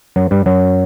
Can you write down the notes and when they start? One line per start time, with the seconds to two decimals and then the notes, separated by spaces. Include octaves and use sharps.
0.16 F#2 F#3
0.31 G2 G3
0.46 F#2 F#3